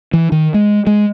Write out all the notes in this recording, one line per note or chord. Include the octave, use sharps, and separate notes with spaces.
E3
D#3
G#3
G#3